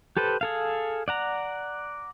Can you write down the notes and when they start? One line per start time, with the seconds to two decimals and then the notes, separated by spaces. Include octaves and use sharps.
0.17 G4 A4 B4 C5
0.41 G#4 A4 F5
1.08 D5 F#5 A#5